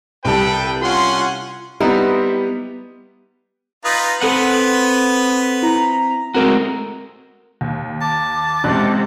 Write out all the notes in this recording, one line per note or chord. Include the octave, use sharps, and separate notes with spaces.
C2 G3 A4 B4 G5 A5
C#4 F4 F#5 C6
G3 B3 C4 D#4 E4
D#4 F4 B4 D#6
B3 C4 A4 B4 F#5 D#7
E4 A#5
G#3 A3 C4 F#4 A#4 A#5
D#2
A5 D6
A1 C3 G#3 F#6